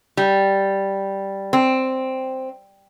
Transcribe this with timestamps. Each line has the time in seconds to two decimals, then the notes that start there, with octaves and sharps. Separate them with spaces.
0.17 G3
1.53 C4